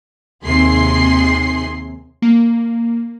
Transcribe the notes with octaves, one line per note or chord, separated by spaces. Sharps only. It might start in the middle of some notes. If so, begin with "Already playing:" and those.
D#2 C3 G#4 C6 C7
A#3